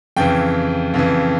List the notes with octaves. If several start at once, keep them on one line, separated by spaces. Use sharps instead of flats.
F2 C#3 E3 G5
F2 C#3 E3